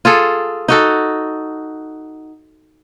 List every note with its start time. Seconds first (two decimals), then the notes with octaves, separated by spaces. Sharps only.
0.05 F4 G#4 A4
0.68 D#4 F#4 A4